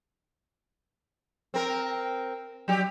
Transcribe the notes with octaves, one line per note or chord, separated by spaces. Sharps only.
C4 A#4
F#3 G4